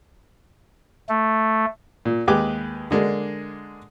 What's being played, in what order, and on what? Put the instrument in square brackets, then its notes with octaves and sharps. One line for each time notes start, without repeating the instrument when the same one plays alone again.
[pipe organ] A3
[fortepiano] A#2
D#2 G#3 G4 B4 G#5 D6
D3 G#3 A#3 D4